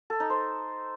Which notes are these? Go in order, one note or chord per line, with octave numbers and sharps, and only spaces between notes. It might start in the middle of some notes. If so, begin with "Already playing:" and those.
A4
D#4
C5